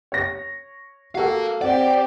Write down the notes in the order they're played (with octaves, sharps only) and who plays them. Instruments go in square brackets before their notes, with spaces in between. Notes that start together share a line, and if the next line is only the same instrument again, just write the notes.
[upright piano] C#5 A#6
[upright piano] F#4 A4 [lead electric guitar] A#4 F5
[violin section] C4 G4 [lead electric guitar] D5 [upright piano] F#5